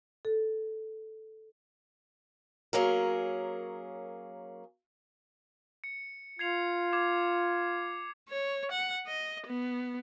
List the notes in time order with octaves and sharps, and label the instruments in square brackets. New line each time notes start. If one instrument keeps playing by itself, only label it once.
[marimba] A4
[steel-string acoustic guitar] F#3 A#3 C#4 G#4 A#4
[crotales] C#7
[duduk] F4 [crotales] G#6 C7 F7
[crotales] D6 G#6
[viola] C#5
F#5
D#5
B3